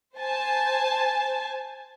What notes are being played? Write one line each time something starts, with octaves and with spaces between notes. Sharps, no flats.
C5 G#5 A5